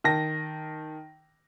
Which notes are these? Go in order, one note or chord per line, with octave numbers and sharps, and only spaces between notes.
D#3 A5 A#6